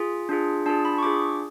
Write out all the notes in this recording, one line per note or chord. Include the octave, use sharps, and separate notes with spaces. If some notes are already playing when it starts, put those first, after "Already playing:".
Already playing: F4 G#4
D4 F4 G#4
D4 F4 G#4 A5
B5
C#6
D4 F4 G#4 D6